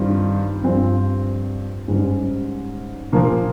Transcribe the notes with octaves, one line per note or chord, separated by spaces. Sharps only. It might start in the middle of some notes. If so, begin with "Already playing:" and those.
Already playing: G2 D#3 G3 C4 F4
G2 F3 C4 F4
G#2 G3 C#4
A#2 F3 A#3